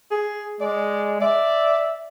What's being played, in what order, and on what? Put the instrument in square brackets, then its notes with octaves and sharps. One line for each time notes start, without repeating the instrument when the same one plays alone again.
[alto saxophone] G#4
[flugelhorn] G#3 [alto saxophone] D5
[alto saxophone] D5 [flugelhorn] E5